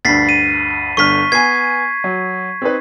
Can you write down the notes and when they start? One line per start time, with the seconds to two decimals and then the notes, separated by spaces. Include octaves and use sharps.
0.05 D2 G2 A6 B6 C7
0.29 D#7
0.97 G1 D3 C#6 F6 B6
1.32 B3 G#5 G#6 C7
2.04 F#3
2.62 C4 D#4 B4